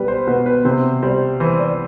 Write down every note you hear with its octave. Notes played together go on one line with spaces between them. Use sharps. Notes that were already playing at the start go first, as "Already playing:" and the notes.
Already playing: B2 G3 B4
C5
B2 B4
B4
C3 C5
G3 C5
E3 C5
D5